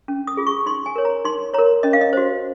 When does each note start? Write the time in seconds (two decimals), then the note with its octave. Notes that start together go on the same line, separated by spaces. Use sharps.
0.08 C#4
0.27 D#6
0.37 F4 G#4
0.47 C#6
0.66 D#4 C6
0.86 G#5
0.96 A#4 C#5
1.05 A#5
1.25 D#4 C6
1.54 A#4 C#5 A#5
1.83 C#4 D#5
1.93 F5
2.01 D#5
2.13 F#4 C5